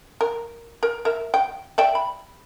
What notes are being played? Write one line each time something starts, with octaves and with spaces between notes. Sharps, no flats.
A#4
A#4
A#4 E5
G5
D5 E5 G5
B5